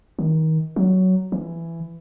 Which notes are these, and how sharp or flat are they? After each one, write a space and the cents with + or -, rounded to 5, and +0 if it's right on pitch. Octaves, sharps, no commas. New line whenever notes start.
D#3 +30
F#3 +10
E3 +15